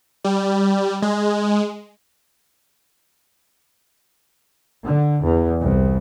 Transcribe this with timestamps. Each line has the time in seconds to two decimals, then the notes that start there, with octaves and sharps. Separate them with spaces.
0.25 G3
1.02 G#3
4.85 D3
5.24 E2
5.62 C2